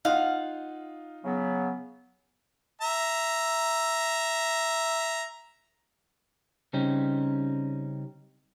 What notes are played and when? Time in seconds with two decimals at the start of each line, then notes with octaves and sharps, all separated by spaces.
0.05 D#4 F4 F5 F#5
1.24 C#3 F#3 B3
2.81 E5 A#5
6.73 C#3 G3 C4 C#4 D#4